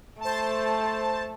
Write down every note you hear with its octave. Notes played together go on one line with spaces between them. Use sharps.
A3 C5 A5